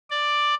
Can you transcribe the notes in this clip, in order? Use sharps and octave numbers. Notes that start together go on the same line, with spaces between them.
D5